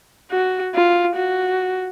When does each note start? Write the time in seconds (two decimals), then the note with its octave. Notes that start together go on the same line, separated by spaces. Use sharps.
0.32 F#4
0.75 F4
1.17 F#4